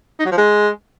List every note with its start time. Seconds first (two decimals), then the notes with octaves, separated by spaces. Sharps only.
0.19 D#4
0.26 F#3
0.32 F3
0.38 G#3